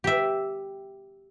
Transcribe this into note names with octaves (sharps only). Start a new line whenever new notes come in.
G4 E5